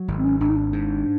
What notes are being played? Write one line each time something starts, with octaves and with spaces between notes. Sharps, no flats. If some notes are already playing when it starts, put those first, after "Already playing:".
Already playing: F#3
G#1
C4
C#4
G#1 D4
D#4
D4
G#2